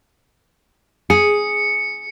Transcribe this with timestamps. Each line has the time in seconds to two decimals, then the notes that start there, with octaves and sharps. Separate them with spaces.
1.10 G#4 C#7